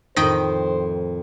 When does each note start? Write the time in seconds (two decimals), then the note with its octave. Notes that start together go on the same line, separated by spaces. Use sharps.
0.16 F2 A2 D#3 C5 D#5 G5